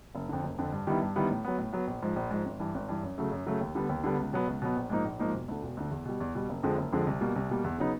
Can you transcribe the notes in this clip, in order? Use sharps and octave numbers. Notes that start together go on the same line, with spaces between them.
F#1
F2 D3
F#1
F2 D3
G2
D#3 G3 B3 E4
G2
D#3 G3 B3 E4
A2
F#3 B3
A2
F#3 B3
A#1
G#2 F3
A#1
G#2 F3
G#1
G2 E3
G#1
G2 E3
F#2
C#3 F#3 A3
F#2
C#3 F#3 A3
D#2
D3 G3 B3
D#2
D3 G3 B3
C#2
B2 F#3 B3
C#2
B2 F#3 B3
A#1
G#2 F3 A#3 D#4
A#1
G#2 F3 A#3 D#4
E1
D2 D3
E1
D2 D3
E2
B2 G3
E2
B2 G3
F#1
F2 D3 F3 G#3
F#1
F2 D3 F3 G#3
C2
B2 G3 A#3
C2
B2 G3 A#3
E2
C#3 F#3 B3 D#4